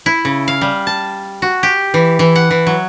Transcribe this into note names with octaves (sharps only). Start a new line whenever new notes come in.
E4
C#3
F5
G3
A5
F#4
G4
E3
E3
F#5
E3
F#3